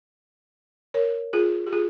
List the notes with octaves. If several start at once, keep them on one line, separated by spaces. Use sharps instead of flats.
A#4 C#5
F4 G#4
G4
F4 G#4